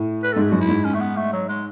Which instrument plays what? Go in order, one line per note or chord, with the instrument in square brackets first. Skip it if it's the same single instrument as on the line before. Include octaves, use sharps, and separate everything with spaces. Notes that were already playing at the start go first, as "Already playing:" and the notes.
Already playing: [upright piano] A2
[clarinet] B4
[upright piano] G#2 [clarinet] A4
[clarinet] G#4
[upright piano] F#2 [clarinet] F#4
[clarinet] E4
[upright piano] G#2
[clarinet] C#4
A3
B3
A3
F#3
G#3